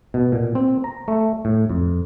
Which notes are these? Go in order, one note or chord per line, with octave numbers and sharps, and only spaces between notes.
B2
A#2
C4
A#5
A3
A2
F2